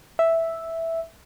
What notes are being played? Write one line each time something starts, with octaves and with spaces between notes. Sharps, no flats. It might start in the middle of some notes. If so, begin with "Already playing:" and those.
E5